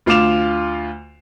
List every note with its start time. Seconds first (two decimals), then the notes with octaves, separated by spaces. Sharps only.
0.06 D2 F4 F5 D6 E7 F7